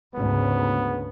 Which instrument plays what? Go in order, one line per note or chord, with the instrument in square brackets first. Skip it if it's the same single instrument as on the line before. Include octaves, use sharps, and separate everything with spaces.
[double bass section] D2 G#2 C#3 [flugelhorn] B3